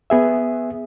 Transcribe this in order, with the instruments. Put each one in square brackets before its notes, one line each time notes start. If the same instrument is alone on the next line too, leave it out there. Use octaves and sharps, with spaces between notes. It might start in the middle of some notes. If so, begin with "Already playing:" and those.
[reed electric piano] B3 G#4 E5